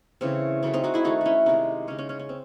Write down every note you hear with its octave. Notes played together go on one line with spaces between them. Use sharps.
C#3 E3 A3 C4
C#3 F#3 A3 C#4
C4 D#4
D#4 F#4
E4 G#4
D#3 A3 D#4 F#4
C#4 E4 F#4
C3 D#3 G#3 C4 D#4
C#3 G#3 C#4
C#4
C#4
C#4
C4